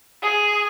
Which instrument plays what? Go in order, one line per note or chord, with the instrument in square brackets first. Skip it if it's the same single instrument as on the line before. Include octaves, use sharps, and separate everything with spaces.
[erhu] G#4